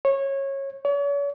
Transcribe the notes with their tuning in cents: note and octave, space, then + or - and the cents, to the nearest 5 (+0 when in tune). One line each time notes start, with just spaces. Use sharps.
C#5 -20
C#5 +40